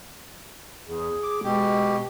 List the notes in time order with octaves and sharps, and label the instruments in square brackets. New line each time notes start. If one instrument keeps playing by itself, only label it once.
[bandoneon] E2 [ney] G#4
[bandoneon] D6
[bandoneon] B2 G4 [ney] G#3